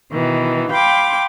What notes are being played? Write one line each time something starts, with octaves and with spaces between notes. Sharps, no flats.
B2 D#3 E3
F5 G5 B5 C6 D6